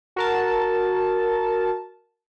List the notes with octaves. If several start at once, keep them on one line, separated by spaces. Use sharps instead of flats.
F#4 A#4 A5